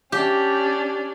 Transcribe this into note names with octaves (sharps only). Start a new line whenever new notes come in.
C#4 D4 G4